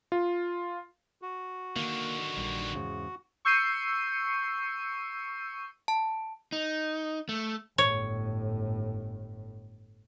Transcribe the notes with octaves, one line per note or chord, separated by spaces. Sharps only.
F4
F#4
D3 D#3 A#3
A#1 G3
E2 G#2 C#3
C#6 E6 G6 C7 C#7 D#7
A5
D#4
A3
G1 A2 C#5